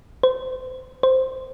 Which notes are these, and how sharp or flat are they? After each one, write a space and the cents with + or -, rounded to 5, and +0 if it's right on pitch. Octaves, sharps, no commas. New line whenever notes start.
C5 -30
C5 -5